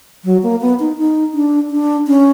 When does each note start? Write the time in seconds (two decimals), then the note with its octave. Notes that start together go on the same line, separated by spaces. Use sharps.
0.25 F#3
0.43 A#3
0.61 B3
0.80 D#4
0.98 D#4
1.34 D4
1.71 D4
2.07 C#4